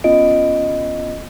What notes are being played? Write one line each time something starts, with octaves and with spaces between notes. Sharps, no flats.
B3 C#4 F4 D#5 D7